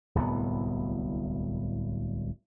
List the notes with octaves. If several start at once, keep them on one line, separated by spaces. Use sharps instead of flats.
D1 C2 A2 B3